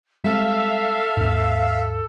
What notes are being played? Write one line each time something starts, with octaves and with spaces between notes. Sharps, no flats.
G3 G#3 C4 A4 E5 F5
D#2 G#2